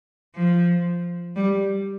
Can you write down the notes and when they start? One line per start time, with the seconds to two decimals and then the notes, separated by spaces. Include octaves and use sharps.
0.35 F3
1.36 G3